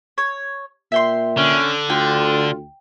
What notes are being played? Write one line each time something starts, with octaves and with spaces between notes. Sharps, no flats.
C#5
A#2 E5 G5 C6
D3 C#4
D2 F4 G5